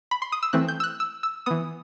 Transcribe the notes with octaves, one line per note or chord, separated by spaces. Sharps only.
B5
C6
D#6
E6
E3 A3 C4 F#6
G6
E6
F#6
E6
E6
E3 B3 D#6